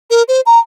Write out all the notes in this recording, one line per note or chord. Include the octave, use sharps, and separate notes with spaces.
A#4
C5
A#5